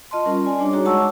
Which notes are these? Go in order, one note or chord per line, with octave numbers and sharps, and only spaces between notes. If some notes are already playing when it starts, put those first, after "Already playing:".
F4 D#5 A5 C6
G3 C#4 A#4
D5 G#5
G3 D4 G4 C#5 D6
G3 D#4 F#4 G#4 C#5 A#5
G#3 D#5 F#5 A5 C#6 E6